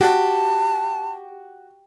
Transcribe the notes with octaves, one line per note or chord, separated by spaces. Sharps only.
F#4 G4 A5